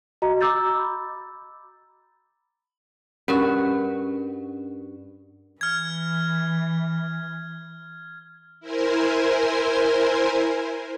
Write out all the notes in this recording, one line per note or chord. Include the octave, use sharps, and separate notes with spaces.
F#4 D#5 A#5
A#5 D6 E6 G6 A6
B5
G2 C#4 F#4 A#4
E3 F6 G#6
E4 A#4 C5 G#5 C6